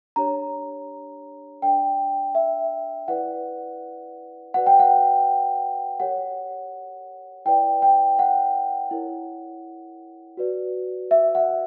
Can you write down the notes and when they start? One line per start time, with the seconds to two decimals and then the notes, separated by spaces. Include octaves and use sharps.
0.16 D4 G4 C#5 A#5
1.62 D4 A#4 D5 G5
2.35 E5
3.08 E4 B4 D5 F#5
4.54 F#4 B4 D5 F#5
4.66 G5
4.79 F#5
6.00 G4 A#4 C#5 F#5
7.45 E4 B4 D5 G5
7.82 G5
8.19 F#5
8.91 E4 A#4 C#5
10.37 F#4 B4 D5
11.11 E5
11.35 F#5